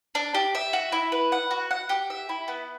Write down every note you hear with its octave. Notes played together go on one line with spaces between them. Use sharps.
D4
G4
E5
F#4
E4
B4
F#5
F#4
F#5
G4
E5
E4
B3